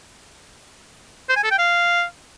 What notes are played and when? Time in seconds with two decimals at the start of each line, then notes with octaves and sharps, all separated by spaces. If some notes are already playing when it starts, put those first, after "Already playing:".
1.29 C5
1.36 G#5
1.44 A4
1.51 G5
1.58 F5